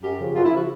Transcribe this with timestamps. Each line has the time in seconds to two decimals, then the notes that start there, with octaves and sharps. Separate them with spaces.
0.02 F#2 G4
0.18 C#3 F3
0.35 F#2 F4
0.45 E4
0.51 C#3 F3 F#4